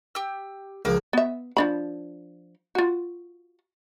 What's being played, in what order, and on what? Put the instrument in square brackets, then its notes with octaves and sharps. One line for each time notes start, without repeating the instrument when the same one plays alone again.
[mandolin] G4 E6
[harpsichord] C#2 F3 [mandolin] A#3 [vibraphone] G#4
[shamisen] B3 E5
F3 D4 B5
F4 F#4